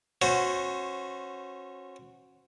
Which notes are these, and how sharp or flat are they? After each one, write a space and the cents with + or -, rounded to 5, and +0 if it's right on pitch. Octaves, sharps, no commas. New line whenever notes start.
C#4 -30 F#4 -15 C5 -20